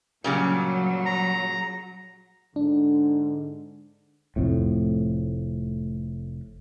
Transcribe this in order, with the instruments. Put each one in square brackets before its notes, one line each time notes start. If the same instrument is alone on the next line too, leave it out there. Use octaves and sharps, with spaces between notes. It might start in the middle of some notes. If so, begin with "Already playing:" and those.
[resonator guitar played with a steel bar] A#2 C#3 G3 [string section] F#3
[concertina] A#5
[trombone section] G#2 D3 [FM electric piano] D4
[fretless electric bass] F1 F2 A2